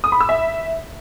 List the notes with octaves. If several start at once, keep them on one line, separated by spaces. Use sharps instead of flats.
D#6
B5
E6
E5